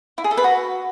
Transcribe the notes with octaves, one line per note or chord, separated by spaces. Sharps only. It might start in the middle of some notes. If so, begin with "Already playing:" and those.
E4
G#4
A4
B4
F#4